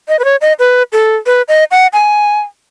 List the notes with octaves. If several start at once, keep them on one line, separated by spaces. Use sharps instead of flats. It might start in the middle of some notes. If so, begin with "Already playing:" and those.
D#5
B4
C#5
D#5
B4
A4
B4
D#5
F#5
G#5